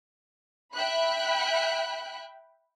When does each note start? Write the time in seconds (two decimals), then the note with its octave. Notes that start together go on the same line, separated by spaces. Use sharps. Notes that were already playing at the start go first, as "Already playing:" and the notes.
0.73 E5 G5 B5 F#6